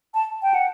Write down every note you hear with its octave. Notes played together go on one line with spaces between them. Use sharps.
A5
G5
F#5